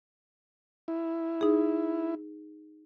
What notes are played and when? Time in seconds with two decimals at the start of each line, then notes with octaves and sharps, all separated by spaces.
0.88 E4
1.41 D#4 G#4